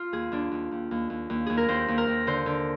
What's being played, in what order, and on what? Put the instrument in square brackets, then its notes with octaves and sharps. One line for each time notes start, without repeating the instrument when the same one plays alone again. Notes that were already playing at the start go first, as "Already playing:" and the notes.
Already playing: [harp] F4
D#2 G#4
D#2 D4
D#2
D#2
D#2
D#2
D#2
D#2 G#4
A#4
D#2 C5
D#2
A#4
D#2
D3 C5
D3